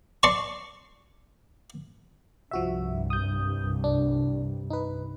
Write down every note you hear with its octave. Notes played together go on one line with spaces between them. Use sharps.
D5 A5 C6 C#6
C2 G2 F3 F#4 E5
D#6 G6
D4
D#4 B4